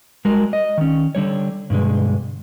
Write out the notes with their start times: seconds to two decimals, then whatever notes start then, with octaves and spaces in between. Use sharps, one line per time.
0.25 G3 G#3 F#4 A#4
0.53 D#5
0.78 D#3 C#4
1.15 D3 G3 C#5
1.70 G2 B2 D3 G#3